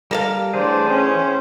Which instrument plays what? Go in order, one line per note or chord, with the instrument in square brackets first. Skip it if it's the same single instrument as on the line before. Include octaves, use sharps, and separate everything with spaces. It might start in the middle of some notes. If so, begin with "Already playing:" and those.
[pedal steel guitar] G3 A#5 [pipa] A#3 A4 F5
[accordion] A2 C5 [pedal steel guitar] E3 G#4 [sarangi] D4
[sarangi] C#4